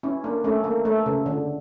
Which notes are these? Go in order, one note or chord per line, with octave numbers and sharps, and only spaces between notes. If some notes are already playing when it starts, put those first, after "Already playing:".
C#4 E4
A#3 D4
A3 C#4
A#3
A3
C#3
D3